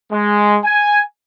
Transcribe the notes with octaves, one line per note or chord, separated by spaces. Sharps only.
G#3
G#5